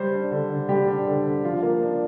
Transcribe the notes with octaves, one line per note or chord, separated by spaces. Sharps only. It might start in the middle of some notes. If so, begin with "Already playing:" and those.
Already playing: G3 C5
D4
D3
D3
G3 G4
D4
D3
D3
F3 F4
A#3
D4